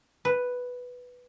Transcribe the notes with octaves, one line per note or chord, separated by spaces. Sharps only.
B4